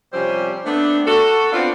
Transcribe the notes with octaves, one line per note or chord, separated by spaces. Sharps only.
C3 F3 G3 C4 C#4 C5
A3 B3 C4 D4
F#4 A4
B3 C4 D4 F4